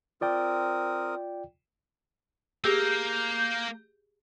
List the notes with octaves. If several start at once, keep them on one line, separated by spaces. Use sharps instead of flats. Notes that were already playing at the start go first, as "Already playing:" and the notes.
C4 F4 A#4 D5 G5 D#6
A#3 G4 G#4 A#4 E6 G6